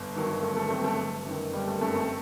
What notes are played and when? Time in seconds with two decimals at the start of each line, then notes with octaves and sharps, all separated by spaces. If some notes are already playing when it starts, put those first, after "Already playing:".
Already playing: G1
0.15 G2 D#3 F#3
0.42 G1 A3
0.57 A3
0.70 G2 D#3 F#3 A3 C4
0.84 A3
0.98 G1
1.26 F#2 D#3
1.53 G1 G3
1.67 A3
1.81 F#2 D#3 A3
1.95 A3 C4